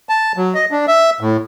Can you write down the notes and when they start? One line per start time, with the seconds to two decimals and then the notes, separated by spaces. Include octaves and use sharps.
0.09 A5
0.37 F#3
0.55 D#5
0.71 D4
0.88 E5
1.21 A2